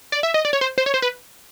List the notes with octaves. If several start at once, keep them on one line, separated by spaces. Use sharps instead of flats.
D5
E5
D#5
D5
C#5
C5
C5
C#5
C5
B4